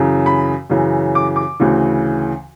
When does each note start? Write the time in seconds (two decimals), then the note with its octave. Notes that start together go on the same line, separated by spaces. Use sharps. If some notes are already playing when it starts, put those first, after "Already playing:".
Already playing: F#2 C#3 E3
0.26 B5
0.70 F#2 C#3 E3
1.15 D6
1.36 D6
1.60 D2 C#3 E3